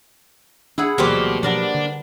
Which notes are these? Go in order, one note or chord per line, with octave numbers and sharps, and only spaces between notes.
D4 E4 G#4 F#5
D2 B2 E3 F#3 G3 A#3 G4 C5
B2 F3 F#3 B3 D4 A#4 D5
D3